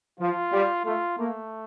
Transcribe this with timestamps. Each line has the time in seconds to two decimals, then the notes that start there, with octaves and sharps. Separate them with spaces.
0.20 F3 F4
0.53 G3
0.85 A3 F4
1.18 A3 A#3